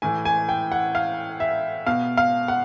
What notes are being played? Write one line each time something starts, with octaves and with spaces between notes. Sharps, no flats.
A2 E3 G#5
G#5
G5
F#5
F5
E5
B2 F5
F5
F#5